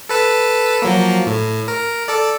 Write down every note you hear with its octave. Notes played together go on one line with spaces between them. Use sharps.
A4 B4 A5
F3 F#3 A#3
A2
A#4
A4 D5